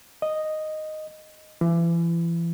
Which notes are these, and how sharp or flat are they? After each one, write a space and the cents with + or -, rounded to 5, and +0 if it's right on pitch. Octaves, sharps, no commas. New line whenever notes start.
D#5 -5
E3 +35